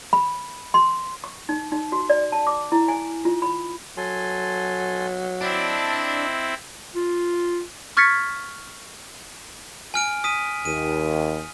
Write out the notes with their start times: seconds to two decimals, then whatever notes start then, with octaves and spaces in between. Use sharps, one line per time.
0.13 B5
0.74 C6
1.24 C#6
1.49 D#4
1.72 D#4
1.92 F#4
2.09 D5
2.32 A5
2.47 D6
2.72 E4
2.88 G#5
3.25 F4
3.42 B5
3.97 F#3 A4 G#5 C6
5.42 C4 D4 E4 D#5
6.96 F4
7.97 C#6 F6 G#6 A6 B6 C#7
9.94 G#5 F6 D7
10.24 D#6 B6 D#7
10.65 D#2 D#7